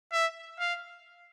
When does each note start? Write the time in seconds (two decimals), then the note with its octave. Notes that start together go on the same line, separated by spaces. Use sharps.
0.12 E5
0.60 F5